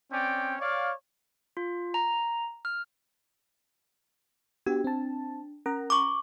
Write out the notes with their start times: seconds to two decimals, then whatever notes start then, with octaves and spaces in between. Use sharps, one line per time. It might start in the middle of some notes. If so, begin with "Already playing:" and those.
0.11 C4 C#4 D5 G5
0.60 C#5 D5 F5
1.57 F4
1.94 A#5
2.65 F6
4.66 B3 D4 F#4 G4
4.84 C4 A5
5.66 C#4 A#4 A#5
5.90 C#6 D6